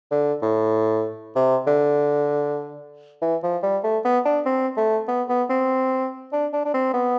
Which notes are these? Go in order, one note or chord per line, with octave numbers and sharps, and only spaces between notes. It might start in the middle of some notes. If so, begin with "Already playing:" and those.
D3
A2
C3
D3
E3
F3
G3
A3
B3
D4
C4
A3
B3
B3
C4
D4
D4
D4
C4
B3